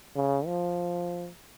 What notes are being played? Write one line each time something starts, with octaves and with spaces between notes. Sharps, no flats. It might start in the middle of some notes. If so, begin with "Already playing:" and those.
C#3
F3